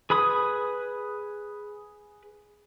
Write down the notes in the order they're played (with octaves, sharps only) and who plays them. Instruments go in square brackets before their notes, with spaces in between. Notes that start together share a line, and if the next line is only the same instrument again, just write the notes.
[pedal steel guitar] G#4 B4 B5 D#6